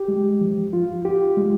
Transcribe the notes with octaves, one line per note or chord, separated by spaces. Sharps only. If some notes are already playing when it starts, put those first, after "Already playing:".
Already playing: G4
G#3
F3
F4
F4 G4
G#3